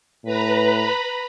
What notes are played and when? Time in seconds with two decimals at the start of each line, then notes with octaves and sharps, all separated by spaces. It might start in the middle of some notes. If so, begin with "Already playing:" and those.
0.24 A2 B4 A#5 B5